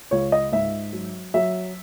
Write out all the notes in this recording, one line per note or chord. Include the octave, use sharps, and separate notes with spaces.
C#2 C#5
D#5
G#2 E5
F#3
F#3 E5